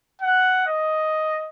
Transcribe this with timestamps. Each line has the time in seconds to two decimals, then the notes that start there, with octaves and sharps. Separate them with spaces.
0.21 F#5
0.67 D#5